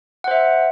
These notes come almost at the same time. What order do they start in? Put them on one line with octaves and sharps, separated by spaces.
F#5 C5 E5